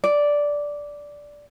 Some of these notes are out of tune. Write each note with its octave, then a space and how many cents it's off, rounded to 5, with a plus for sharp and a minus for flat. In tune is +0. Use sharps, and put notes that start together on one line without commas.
D5 -5